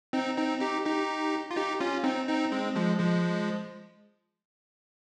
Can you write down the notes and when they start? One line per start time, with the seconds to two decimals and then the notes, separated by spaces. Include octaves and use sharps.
0.13 C4 D#4
0.37 C4 D#4
0.61 D#4 G4
0.85 D#4 G4
1.51 F4
1.56 D#4 G4
1.80 C#4 F4
2.04 C4 D#4
2.28 C4 D#4
2.52 G#3 C4
2.76 F3 G#3
2.99 F3 G#3